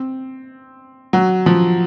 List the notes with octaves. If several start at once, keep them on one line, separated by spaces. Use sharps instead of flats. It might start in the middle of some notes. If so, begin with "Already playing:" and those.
Already playing: C4
F#3
F3